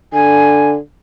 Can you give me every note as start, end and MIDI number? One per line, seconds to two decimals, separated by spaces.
0.13 0.77 50
0.13 0.67 80